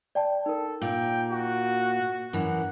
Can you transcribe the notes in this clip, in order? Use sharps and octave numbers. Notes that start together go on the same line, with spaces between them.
D5 G5 A5
D#4 A4 A#4
A#2 G5
F#4
F#2 E3 F#5